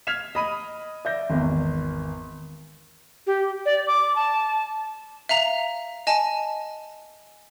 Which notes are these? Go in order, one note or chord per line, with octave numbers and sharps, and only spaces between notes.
F6 G#6 B6 C7 E7 F7
D#5 B5 D#7
D5 E5 G6 A#6
G#1 E2
G4
D5
D6
A5
E5 F5 A#5 F7
D#5 G#5 A5